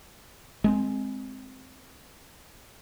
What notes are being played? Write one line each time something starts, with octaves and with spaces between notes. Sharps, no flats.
G#3 A#3 C4